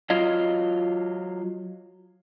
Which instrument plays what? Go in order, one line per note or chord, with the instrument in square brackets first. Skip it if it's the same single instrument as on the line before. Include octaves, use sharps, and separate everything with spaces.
[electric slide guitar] F#3 F4 D#5 F5